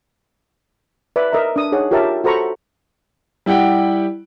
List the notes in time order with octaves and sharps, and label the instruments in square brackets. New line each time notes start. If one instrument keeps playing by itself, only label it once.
[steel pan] B4 D5 E5 B5 D6
A#4 D#5 E5 A#5
D4 D#6
D#4 G#4 C#5 F#5
F4 G4 A#4 C#5 E5 A5
F#4 A4 C5 A#5 B5 C#6
[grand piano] G3 E4 G4 F#5 G5